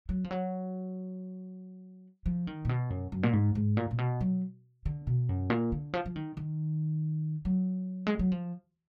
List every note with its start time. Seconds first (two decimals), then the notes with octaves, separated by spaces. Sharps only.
0.09 F#3
0.24 F3
0.31 F#3
2.26 F3
2.47 D#3
2.65 A#2
2.69 B2
2.90 F#2
3.12 F#2
3.23 A#2
3.33 G#2
3.55 G#2
3.77 A#2
3.91 A#2
3.98 B2
4.21 F#3
4.85 D3
5.07 B2
5.29 F#2
5.50 A#2
5.72 D3
5.93 F3
6.06 F3
6.16 D#3
6.37 D#3
7.45 F#3
8.07 G#3
8.19 F#3
8.32 F3